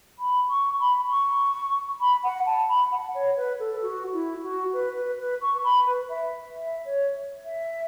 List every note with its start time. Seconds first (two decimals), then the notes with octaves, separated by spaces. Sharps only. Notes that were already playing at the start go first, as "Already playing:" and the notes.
0.19 B5
0.49 C#6
0.80 B5
1.10 C#6
2.00 B5
2.24 F#5
2.46 A5
2.68 B5
2.92 F#5
3.15 C#5
3.37 B4
3.59 A4
3.82 F#4
4.13 E4
4.43 F#4
4.73 B4
4.96 B4
5.19 B4
5.41 C#6
5.64 B5
5.86 B4
6.09 E5
6.55 E5
6.85 C#5
7.45 E5